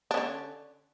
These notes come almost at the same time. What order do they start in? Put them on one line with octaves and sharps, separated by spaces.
D4 C#4 D3